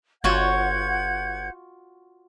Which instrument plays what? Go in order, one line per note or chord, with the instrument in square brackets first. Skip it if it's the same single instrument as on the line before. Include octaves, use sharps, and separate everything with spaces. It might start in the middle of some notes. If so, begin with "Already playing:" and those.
[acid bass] G1 [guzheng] F4 F#4 C#5 [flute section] F#5 G6 G#6